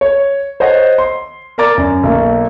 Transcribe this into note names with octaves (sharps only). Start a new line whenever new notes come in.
C#5
C5 C#5 D#5 F#5
C6
A#4 D5 A#5 D6 A6
F#2
B1 A#3